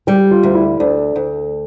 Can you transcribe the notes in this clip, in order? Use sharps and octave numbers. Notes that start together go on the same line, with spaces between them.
G3 G4
F4
D2
E4
D2 D4
D2